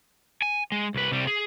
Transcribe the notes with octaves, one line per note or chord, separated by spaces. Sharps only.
G#5
G#3
C2 B4
C3 G3
G#4